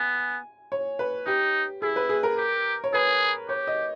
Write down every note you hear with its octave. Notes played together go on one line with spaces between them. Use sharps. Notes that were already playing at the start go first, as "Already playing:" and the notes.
Already playing: B3 G#5
C#5
B4
D#4 G4
E4 G#4
B4
G#4
A#4
G4
C#5
G#4 B4
G4 C#5
D#5